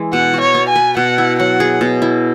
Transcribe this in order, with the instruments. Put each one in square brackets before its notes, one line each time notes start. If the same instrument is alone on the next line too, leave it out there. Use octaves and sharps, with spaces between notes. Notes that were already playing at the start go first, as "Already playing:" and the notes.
Already playing: [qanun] E3 G#3 E4
[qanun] B2 [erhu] F#5
[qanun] F#4
[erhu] C#5
[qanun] B3
[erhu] G#5
[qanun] B4
[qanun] B2 [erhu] F#5
[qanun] E4
[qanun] F#3 [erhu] F#5
[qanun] G#4
B2
E4